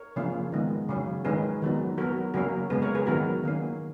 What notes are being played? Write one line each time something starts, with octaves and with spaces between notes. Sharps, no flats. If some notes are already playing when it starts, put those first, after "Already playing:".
Already playing: A#4 C#5
C#3 F3 A#3 C#4
D#3 G#3 B3
C#3 F#3 C#4
D#3 G#3 C#4 G#4 B4
D#3 F#3 B3
F#3 B3 F#4 A#4
C#3 F#3 A#3 C#4 F#4 A#4
C#3 G#3 B3 G#4 B4
A#4 C#5
G#4 B4
D#3 F#3 B3 F#4 A#4
D#3 A#3 C#4